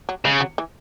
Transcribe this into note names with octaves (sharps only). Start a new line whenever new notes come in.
F#3
C#3 G#3
F#3
E3